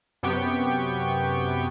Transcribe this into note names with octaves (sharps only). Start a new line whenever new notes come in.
F#2 C3 B3 G4 G5 C#6